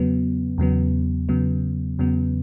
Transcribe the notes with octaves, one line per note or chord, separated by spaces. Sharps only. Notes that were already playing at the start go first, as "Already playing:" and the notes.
Already playing: E2 C#3 F#3 B3
E2 C#3 F#3 B3
E2 C#3 F#3 B3
E2 C#3 F#3 B3